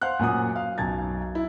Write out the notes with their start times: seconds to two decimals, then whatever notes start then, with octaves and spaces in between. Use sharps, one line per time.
0.01 C5 F5 F#5 C6 F#6
0.19 F#2 A#2 F#5 D#6
0.56 F5
0.78 B1 F#2 A5 G#6 A6
1.35 E4